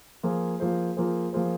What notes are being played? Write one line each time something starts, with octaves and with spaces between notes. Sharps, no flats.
F3 A#3 F4 G#4 C5
F3 A#3 F4 G#4 C5
F3 A#3 F4 G#4 C5
F3 A#3 F4 G#4 C5